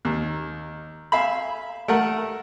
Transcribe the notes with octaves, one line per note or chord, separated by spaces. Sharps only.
D#2
E5 F5 G#5 B5
A3 A#4 F#5